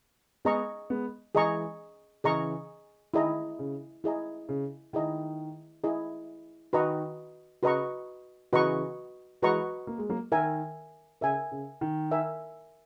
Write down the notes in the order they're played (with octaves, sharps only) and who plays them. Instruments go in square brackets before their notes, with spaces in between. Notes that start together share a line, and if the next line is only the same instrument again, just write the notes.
[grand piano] G#3 B3 [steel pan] G#4 D#5 A#5 C#6
[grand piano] G#3 B3
[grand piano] E3 G#3 [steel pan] G#4 D#5 A#5 C#6
[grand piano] C#3 E3 [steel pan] G#4 D#5 A#5 C#6
[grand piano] D#3 [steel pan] E4 G#4 D#5 A#5
[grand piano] C#3
[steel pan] E4 G#4 D#5 A#5
[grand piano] C#3
[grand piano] D#3 [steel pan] E4 G#4 D#5 A#5
[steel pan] E4 G#4 D#5 A#5
[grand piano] D#3 [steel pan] F#4 B4 D#5 A#5 C#6
[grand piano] C#3 [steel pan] F#4 B4 D#5 A#5 C#6
[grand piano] C#3 E3 [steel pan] F#4 B4 D#5 A#5 C#6
[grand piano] E3 G#3 [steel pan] F#4 B4 D#5 A#5 C#6
[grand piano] A#3
G#3
F#3 A#3
[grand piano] D#3 [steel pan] A#4 E5 G#5
[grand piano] C#3 [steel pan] A#4 E5 G#5
[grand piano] C#3
D#3
[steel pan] A#4 E5 G#5